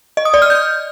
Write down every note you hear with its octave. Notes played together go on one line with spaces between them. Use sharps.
D#5
D#6
D5
F6
G6